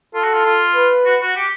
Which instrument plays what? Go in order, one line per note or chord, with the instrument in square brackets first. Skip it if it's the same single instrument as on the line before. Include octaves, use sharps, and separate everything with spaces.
[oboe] F4 [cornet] A4
[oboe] F#4
F4
F4
[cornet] B4
[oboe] F#4
F#4
G4